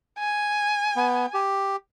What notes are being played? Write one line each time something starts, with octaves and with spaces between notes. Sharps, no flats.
G#5
B3
G4